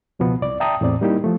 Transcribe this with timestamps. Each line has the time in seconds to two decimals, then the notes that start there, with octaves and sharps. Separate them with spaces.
0.19 C#2 B2 F3 B3
0.42 C2 D5
0.60 E5 G5 A5 A#5 D#6
0.81 E2 A2 C4 D5
1.01 G3 A#3 D#4 E4 G4
1.24 F3 A3